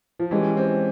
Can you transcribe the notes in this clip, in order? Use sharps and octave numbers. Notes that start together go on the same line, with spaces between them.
F3
E3 G#3 C#4 G4
C4